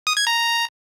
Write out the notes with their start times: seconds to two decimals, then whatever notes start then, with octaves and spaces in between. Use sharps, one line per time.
0.07 D#6
0.17 G#6
0.27 A#5